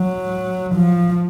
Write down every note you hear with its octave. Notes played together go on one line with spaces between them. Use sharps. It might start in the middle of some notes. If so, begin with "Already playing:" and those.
Already playing: F#3
F3